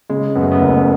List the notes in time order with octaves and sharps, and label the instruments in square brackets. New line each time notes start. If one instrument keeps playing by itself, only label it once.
[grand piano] C#3 [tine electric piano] G#3
[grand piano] F#2 [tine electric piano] B3
[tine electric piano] A3
B3
[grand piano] F#1